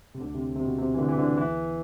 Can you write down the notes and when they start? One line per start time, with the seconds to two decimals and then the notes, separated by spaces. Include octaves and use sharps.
0.15 C3
0.20 D2 D3
0.35 C3
0.56 C3
0.64 B2
0.79 C3
0.94 E3
0.98 D2 D3
1.08 E3
1.18 D2 D3
1.37 E2 E3